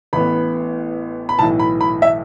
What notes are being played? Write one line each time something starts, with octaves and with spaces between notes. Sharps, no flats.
A1 A2 E3 B3 B5
B5
B1 A2 E3 A5
B5
B5
E5